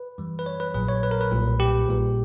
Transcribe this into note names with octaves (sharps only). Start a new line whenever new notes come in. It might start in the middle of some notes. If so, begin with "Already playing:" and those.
Already playing: B4
F#2 E3 G3
B4
C#5
B4
A#1 A#2 F#3 B4
C#5
B4
A#4
B4
B1 A#2 G3
G4
A#1 A#2 G3